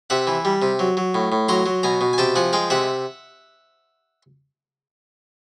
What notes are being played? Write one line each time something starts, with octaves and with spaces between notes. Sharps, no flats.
C3 E5 F#5
E3
G3
C3
F#3
F#3
A2
A2
F#3 A#5 C6
F#3
B2 G#5 A#5
B2
G#5
C3 G5 A5
F3 F#5 G#5
G#3 F5 G5
C3 E5 F#5